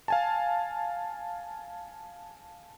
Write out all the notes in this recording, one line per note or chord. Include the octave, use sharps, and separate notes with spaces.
F5 G#5 A5